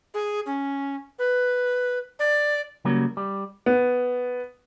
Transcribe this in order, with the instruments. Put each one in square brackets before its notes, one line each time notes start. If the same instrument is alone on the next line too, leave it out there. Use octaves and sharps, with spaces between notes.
[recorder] G#4
C#4
B4
D5
[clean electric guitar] C#3 F#3 G3 A#3
G3
[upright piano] B3